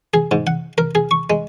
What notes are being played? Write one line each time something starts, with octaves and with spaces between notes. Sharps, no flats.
G#4
G#2
F#5
A#4
G#4
C#6
G#3